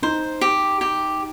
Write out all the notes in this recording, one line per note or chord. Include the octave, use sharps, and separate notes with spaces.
D#4 C5
G4
G4